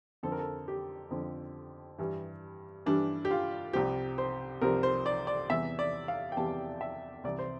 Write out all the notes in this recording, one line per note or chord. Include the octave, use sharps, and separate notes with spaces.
F2 D3 F3 A4
A#4
A4
G4
F2 D3 F3
G2 E3 G3
G2 E3 G3 D4
G4
F4
C2 C3 F3 G4
C5
C2 C3 F3 A#4
C5
D5
D5
E2 C3 E3 G3 E5
D5
F5
G5
E2 C3 E3 G3 A5
E5
C2 C3 E3 G3 D5
C5